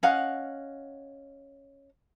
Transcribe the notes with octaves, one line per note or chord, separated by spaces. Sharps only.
C#4 D#5 F5 F#5